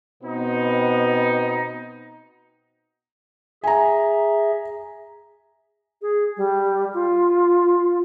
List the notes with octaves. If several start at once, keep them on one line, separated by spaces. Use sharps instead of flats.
B2 B3 C4 D#4
G#4 E5 G#5 A#5
G#4
G3
F4